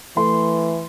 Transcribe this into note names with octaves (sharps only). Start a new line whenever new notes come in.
E3 A3 C6